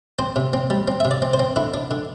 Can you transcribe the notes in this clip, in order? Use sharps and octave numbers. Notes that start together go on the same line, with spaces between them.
C4 C5
C3
C4
G3
C4
C3 E5
D5
C4
C5
C4
D3 E4
D4
D3